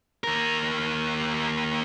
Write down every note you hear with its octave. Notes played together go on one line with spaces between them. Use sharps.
D#2 A#4